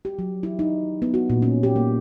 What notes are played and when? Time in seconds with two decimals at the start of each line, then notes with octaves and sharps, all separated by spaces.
0.05 G4
0.19 F#3
0.43 E4
0.59 D#4
1.02 B3
1.14 F#4
1.30 A#2
1.42 C#4
1.63 G4
1.76 A#3